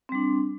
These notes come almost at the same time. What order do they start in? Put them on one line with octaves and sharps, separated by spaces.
C4 G3 D4